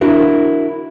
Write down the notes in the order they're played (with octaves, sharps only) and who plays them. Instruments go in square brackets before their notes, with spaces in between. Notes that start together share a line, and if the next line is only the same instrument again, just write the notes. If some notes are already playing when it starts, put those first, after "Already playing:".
[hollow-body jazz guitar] D4 E4 F#4 A#4